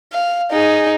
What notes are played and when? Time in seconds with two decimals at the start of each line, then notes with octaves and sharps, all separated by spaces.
0.12 F5
0.52 D#4 G#4